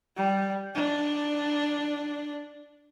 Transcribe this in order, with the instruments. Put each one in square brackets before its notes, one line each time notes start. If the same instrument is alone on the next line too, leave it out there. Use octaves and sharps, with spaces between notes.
[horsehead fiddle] G3
D4